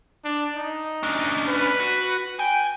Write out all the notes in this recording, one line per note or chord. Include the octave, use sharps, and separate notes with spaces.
D4
D#4
C#4 D4
B4
F#4
G5 G#5